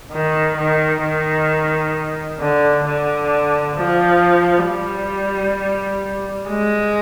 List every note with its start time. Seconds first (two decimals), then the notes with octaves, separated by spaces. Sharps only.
0.12 D#3
0.57 D#3
1.03 D#3
2.40 D3
2.85 D3
3.76 F3
4.67 G3
6.49 G#3